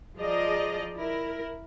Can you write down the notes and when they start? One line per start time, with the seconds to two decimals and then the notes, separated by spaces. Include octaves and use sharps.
0.17 F3 G#4 D5 D#5 A#5
0.95 E4 A#4